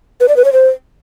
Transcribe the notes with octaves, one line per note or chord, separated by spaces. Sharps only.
B4
D5
B4
C#5
C5